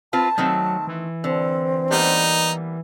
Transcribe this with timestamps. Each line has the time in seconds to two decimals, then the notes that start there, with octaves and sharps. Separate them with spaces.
0.13 C4 F4 B4 A5
0.38 D#3 F#3 A3 C4
0.87 E3
1.24 D3 C4
1.91 G3 A#3 B3 D#4